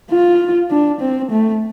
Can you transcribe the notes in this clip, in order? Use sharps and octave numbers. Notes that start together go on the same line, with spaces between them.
F4
D4
C4
A3